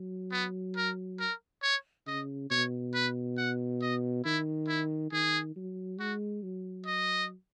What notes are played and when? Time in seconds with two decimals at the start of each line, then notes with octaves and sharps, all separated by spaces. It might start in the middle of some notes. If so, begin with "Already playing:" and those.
Already playing: F#3
0.32 B3
0.76 A#4
1.20 A#4
1.62 C#5
2.07 C#3 D#5
2.50 B2 C#5
2.94 B4
3.38 F#5
3.82 D#5
4.25 D#3 E4
4.68 E4
5.12 D#3 G#4
5.56 F#3
5.99 G#3 F#4
6.43 F#3
6.86 D#5